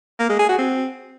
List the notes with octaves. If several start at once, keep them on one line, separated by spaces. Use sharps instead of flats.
A#3
G#3
G#4
F#4
C4